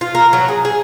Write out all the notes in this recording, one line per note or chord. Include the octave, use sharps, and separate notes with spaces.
F4
A#4
F#3
G#4
G#4